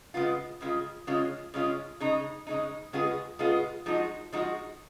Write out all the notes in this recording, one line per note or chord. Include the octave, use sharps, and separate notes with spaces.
C#3 G#3 B3 F4
C#3 G#3 B3 F4
C#3 G#3 C#4 F4
C#3 G#3 C#4 F4
C#3 G#3 D#4
C#3 G#3 D#4
C#3 G#3 B3 F4 G#4
C#3 G#3 B3 F4 G#4
F3 G#3 D#4 F#4
F3 G#3 D#4 F#4